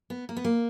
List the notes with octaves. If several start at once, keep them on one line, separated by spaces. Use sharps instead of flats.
B3
A#3
B3
A#3